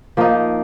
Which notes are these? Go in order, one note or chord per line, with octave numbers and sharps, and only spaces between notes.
F3 A#3 D#4